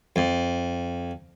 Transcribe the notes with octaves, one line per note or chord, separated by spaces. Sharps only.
F2